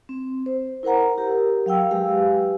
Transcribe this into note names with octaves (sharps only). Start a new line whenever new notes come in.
C4
C5
E4 A#4 C5 F#5 A#5
G4 A#4
F#3 F5 G5 E6
G#3 G4 G#4 B4 F5 G#5